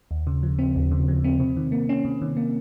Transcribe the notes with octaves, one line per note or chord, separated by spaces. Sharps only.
D#2
C#3
F3
C4
D#2
C#3
F3
C4
C3
D#3
A#3
C#4
C3
D#3
A#3